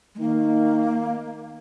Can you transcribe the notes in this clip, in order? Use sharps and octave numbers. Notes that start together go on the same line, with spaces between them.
G#3
D#3 A#3